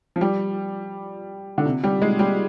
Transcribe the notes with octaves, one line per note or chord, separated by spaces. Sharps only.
F3
G3
D3
C3
G3
G#3
G3